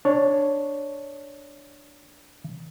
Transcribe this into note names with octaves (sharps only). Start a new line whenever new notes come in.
D4 C#5